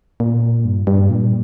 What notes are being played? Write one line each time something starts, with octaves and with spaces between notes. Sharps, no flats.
A#2
G2
G2
A#2